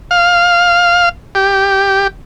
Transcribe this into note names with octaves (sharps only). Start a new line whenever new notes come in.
F5
G4